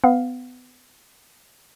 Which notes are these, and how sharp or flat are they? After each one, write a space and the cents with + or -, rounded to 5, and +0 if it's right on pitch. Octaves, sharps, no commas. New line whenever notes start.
B3 +30 F5 +10